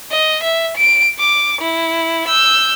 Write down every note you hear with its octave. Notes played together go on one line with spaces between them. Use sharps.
D#5
E5
D7
D6
E4
E6 G6